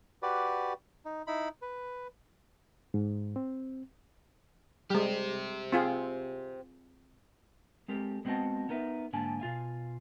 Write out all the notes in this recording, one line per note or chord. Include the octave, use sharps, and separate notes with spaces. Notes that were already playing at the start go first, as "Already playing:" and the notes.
F#4 G4 B4 D5
D#4
D#4 E4 B5
B4
G#2
C4
G3 G#3 G4 C5
C4 F4 G#4
G#3 C4 G4 A4 A#4
G#3 B3 C4 F#4 D#5 A5
B3 D#4 A#4 B4 E5
G#2 D3 A#3 D4 G#5 A5
B2 F4 F5 G#5